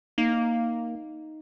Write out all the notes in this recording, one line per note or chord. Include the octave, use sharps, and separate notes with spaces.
A#3 D#4